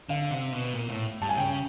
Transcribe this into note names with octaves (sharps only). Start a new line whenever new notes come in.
D3 F5
C3
B2
A#2
A2
G2 A5
G#5
C#3 G5